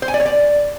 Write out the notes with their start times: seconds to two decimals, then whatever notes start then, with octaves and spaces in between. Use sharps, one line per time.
0.02 C5
0.08 G#5
0.14 D5
0.20 C#5
0.26 D5